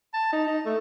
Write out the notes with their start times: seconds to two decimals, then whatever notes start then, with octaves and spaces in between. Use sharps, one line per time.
0.14 A5
0.33 D#4
0.47 D#4
0.66 A3